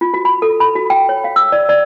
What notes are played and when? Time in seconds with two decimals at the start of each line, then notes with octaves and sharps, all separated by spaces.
0.01 F4
0.14 F#4
0.25 B5
0.42 A4
0.60 B5
0.75 F#4
0.90 G5
1.09 C#5
1.24 F5
1.36 E6
1.52 D5
1.69 D5